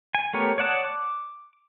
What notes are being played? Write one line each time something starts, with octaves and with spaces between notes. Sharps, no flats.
G#5
A3 B3 G4 A#4 C#5
C#5 D5 F#5 A5 D#6
D6